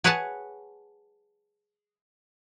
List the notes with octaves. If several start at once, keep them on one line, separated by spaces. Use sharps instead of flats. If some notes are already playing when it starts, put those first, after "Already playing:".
G#4 B4 C#5 F#5 G#5 A5